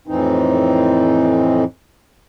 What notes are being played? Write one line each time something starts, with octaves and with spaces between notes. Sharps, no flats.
F2 A2 E3 C4 D#4